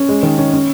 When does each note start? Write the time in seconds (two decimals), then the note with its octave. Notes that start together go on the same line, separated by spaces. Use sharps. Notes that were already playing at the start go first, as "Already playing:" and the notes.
Already playing: C#4
0.09 G#3
0.23 D#3
0.38 C#4
0.53 C#4